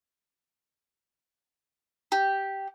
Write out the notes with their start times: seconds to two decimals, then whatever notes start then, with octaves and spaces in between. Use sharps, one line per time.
2.12 G4